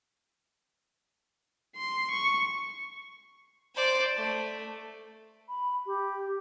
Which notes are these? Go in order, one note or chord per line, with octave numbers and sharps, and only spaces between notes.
C6
C#6
C5 D5
A3
B5
G4